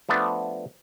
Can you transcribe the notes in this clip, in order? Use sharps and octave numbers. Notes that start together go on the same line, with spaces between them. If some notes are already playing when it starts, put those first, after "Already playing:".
F3 A3 B3 D4